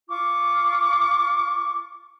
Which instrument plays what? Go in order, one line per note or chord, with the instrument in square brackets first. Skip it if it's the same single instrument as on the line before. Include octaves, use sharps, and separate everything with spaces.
[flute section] F4 C#6 D6